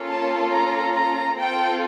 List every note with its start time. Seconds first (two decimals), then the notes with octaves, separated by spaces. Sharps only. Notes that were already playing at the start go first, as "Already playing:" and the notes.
Already playing: A#3 C#4 F4 A4
0.09 A5
0.52 A#5
0.95 A#5
1.38 C4 F4 A4 G5